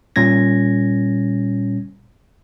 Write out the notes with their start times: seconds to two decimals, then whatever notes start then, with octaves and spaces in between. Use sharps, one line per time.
0.16 A#2 G3 C#4 G#6 A#6